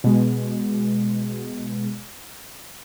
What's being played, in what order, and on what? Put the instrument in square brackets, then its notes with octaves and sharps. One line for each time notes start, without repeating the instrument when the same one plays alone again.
[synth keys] B2 G#3